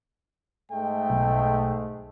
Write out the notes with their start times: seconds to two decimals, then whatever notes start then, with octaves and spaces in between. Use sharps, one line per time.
0.71 G#2 G#3 A3 G5
1.10 B1